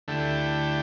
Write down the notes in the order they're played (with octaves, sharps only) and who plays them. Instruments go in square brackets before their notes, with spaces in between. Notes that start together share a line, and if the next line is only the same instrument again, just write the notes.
[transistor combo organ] D2 D3 A3 E4 G4